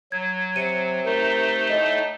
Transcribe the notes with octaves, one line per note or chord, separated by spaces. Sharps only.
F#3 G#6
C3 C#7 D#7
A3 D#4 A#4
A2 D#5